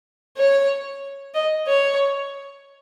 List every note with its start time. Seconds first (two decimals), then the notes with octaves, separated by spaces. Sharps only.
0.37 C#5
1.34 D#5
1.67 C#5